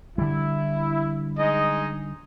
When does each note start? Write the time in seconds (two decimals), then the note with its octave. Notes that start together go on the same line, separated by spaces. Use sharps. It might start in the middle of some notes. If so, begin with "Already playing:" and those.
0.18 D3 G3 E4
1.37 G#3 D#4 D#5